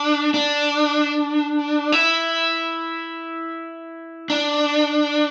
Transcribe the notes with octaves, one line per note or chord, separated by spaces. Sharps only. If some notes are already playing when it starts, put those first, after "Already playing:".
Already playing: D4
D4
E4
D4